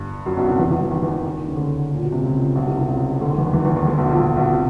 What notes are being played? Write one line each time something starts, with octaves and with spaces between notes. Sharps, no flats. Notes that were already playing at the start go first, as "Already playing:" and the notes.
Already playing: G1 G2
F#2
B1 B2
C2 C3
E2 E3
E2 E3
E2 E3
D#2 D#3
E2 E3
E2 E3
D#2 D#3
C#3
D2 D3
A#2
B2
C3
C#2 C#3
B1 B2
C2 C3
C2 C3
C#2 C#3
D2 D3
D#2 D#3
E2 E3
D#2 D#3
E2 E3
E2 E3
D#2 D#3
D2 D3
B1 B2
A#1 A#2
A#1 A#2
B1 B2
C3